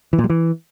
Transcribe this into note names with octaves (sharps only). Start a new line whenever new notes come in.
E3
A#2
G3
E3